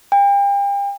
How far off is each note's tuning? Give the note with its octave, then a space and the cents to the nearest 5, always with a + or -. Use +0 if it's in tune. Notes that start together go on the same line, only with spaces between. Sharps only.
G5 +40